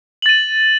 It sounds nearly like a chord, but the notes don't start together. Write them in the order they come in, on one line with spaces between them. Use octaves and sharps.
F#7 A6 D#7